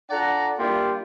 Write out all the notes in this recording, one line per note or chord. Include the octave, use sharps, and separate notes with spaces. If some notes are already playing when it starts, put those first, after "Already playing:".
D4 F4 A4 D5 F#5 A#5
G3 A#3 D4 E4 F4 G4